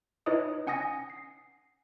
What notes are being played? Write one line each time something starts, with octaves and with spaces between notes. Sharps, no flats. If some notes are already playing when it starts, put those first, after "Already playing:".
D#4 E4 B4 C#5 D#5 D#6
C#4 F#5 G#5 D#6 A#6
C7